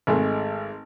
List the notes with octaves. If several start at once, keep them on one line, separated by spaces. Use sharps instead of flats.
G#1 G#3 A3